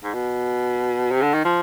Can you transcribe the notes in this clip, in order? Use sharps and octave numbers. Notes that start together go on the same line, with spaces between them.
G#2
B2
C3
D3
D#3
F3